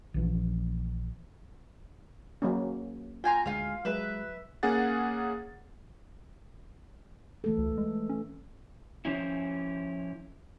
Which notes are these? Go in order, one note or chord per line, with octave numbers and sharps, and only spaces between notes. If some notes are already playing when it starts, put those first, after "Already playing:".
A#1 E3 F3
F#3 A#3 C#4
F4 G5 G#5 A#5 C6
D2 G#3 F4 F5 G#5
F#3 G#3 B4 E5
A#3 C#4 G#4 F#5 A6
E3 A3 A4
D2
G#3
C#4
F3 C#4 E4